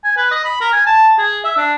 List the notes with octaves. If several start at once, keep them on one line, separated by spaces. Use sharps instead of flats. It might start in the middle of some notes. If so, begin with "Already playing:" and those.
G#5
B4
D#5
B5
A#4
G#5
A5
G#4
E5
D4